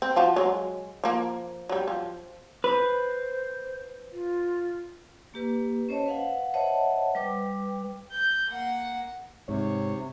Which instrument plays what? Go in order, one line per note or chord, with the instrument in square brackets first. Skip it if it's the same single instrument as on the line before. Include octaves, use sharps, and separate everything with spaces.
[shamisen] C4
F3 F4 F#4
F#3 G#3
F3 A#3
F#3 G3
F3
[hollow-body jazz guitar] B4 [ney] C5
[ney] F4
[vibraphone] A#3 G4 B4
C#4 C5 C#5 D#5 A5
B4 F5 F#5
C5 C#5 D#5 E5 F#5 A5
G3 B4 G5 D6
[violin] G6
A#3 F#5
[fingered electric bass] G#2 [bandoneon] C3 [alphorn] C#5